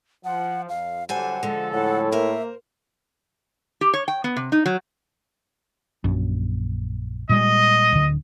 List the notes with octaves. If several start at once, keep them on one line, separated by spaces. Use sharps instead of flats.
F3 F#5
F2 F5
D3 F#3 G3 A4 C5 F#5 G#5
D3 F3 G#3 A4
A2 F#5
A#3 A#4 C5 E5
G4
C#5
G5
B3
C3
D#4
F#3
A#1 F#2
A#2 G3 G#3 D#5
D1 D3